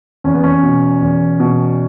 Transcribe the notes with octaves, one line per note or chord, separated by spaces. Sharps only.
E2 C#4
B3
C#4
B2
E2
B2